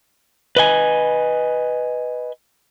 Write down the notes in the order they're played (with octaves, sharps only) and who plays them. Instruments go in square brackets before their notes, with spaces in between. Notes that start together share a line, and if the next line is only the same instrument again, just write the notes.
[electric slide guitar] B4 D#5 G#5